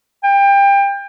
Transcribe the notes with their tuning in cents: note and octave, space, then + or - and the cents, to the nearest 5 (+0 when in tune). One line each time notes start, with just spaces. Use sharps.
G5 +25